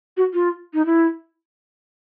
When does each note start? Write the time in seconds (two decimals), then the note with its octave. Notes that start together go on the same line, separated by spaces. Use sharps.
0.17 F#4
0.34 F4
0.74 D#4
0.86 E4